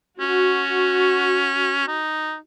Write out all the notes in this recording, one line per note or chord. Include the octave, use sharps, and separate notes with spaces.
C#4 F#4
D#4